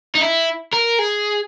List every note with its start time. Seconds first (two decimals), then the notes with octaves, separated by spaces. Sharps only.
0.15 D#4
0.21 E4
0.73 A#4
0.99 G#4